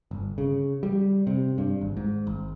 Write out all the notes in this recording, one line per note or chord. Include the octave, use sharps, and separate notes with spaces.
G1
C#3
G3
C3
G2
G#1
G#2
G#1